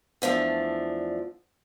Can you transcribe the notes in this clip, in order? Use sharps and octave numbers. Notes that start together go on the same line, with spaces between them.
E2 F3 A3 D4